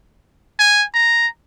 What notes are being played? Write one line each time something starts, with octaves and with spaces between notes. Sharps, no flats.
G#5
A#5